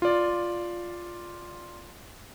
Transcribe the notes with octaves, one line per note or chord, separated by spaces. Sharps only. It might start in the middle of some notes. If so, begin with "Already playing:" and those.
F4 D5